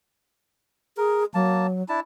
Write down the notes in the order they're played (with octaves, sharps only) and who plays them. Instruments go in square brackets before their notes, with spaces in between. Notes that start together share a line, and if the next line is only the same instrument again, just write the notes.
[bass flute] G#4 [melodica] A#4
[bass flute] F#3 [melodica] A#3 A5
[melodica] D4 E4 A5